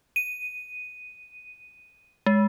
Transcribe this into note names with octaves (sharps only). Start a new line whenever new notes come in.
D#7
G#3